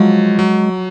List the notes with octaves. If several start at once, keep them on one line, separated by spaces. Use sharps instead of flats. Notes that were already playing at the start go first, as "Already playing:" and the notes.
Already playing: F3 F#3 G#3
F#3